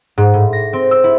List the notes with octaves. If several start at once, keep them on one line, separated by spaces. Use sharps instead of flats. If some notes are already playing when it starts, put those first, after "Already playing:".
G#2
A2
A#6
C4
E6
E4